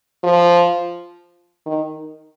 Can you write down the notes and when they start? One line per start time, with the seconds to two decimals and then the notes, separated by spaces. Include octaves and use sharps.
0.23 F3
1.66 D#3